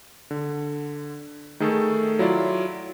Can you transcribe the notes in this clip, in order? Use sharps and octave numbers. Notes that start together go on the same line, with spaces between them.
D3
D#3 A3 G#4 A4
F#3 E4 F4 D5